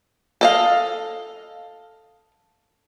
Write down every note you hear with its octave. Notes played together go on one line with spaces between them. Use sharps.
A4 D#5 F5